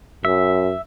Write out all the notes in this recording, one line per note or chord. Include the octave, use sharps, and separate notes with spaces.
F#2 E5